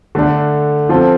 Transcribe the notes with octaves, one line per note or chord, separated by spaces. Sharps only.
D3 A3 D4
F3 C4 F4 A4